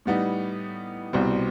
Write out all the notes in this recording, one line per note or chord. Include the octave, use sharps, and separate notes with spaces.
A2 G3 B3 D#4
C2 B2 G3 C4